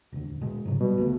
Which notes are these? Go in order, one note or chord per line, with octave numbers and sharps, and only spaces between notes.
E1 D2
B2 G#3
G#2 C#3 F#3
B2 G3
C#2 G#3 A3